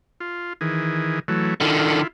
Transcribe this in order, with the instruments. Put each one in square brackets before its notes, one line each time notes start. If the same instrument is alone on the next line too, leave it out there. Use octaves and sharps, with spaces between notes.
[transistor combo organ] F4
D#3 E3 G#4
E3 F#3 A3
[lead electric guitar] D3 D#3 [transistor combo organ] E4 F4